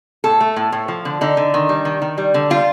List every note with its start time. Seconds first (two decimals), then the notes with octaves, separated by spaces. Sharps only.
0.24 A2 A4
0.41 A3
0.56 A2
0.72 A2
0.88 F3
1.05 D3
1.21 D3 D#4
1.37 D3
1.54 D#3
1.69 G3
1.85 D#3
2.02 D#3
2.18 G3
2.34 D3
2.50 G3 F4